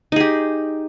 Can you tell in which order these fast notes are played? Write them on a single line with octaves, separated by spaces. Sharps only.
D#4 G#4 G4